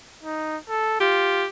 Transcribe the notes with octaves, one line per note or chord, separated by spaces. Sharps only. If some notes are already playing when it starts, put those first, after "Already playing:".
D#4
A4
F4 G4